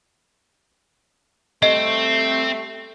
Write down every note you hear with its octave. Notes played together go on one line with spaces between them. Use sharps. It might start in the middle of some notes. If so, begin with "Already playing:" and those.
G3 A3 C4 D#5